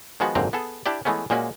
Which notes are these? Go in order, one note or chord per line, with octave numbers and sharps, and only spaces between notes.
D#3 F3 G#3 B3 F#4
G#1 F#2 A#2 D3 C4 A#5
B3 G#4 A4
D4 E4 G4 D5
E3 G#3 A3 B3 C#4
A#2 G#3 A#3 C#4 F#4